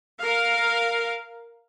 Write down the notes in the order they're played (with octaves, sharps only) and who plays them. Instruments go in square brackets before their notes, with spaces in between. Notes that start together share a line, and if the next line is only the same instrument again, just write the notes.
[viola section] A#4 F5